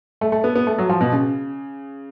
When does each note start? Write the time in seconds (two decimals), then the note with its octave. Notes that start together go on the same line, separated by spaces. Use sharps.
0.21 A3
0.32 A3
0.44 B3
0.55 B3
0.67 A3
0.78 F#3
0.89 F3
1.01 B2
1.13 C#3